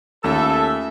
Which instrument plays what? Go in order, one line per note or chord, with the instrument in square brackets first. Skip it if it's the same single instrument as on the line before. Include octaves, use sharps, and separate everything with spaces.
[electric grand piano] D#2 [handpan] A3 C#4 F4 [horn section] A4 [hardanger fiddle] E5